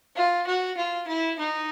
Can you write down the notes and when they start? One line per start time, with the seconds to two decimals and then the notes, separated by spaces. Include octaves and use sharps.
0.16 F4
0.46 F#4
0.77 F4
1.07 E4
1.39 D#4